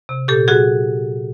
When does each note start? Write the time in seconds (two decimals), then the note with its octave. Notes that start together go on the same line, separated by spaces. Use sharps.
0.09 C3
0.28 A#2 G4 A4
0.48 F#3 F#4 G#4